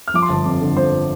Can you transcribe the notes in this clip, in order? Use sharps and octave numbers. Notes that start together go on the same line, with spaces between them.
F6
F3 D6
C6
G1 A5
F2 D6
D3
F3 C5